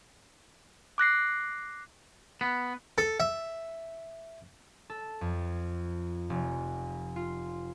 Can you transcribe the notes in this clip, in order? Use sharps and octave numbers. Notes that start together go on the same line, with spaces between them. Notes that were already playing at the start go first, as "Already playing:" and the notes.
D6 F#6 A#6 C7
B3
A4
E5
A4
F2
F1
F4